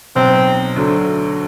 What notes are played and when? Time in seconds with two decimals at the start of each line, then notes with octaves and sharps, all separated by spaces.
0.16 B1 B2 F#3 C4
0.76 D2 D3 F#3 A3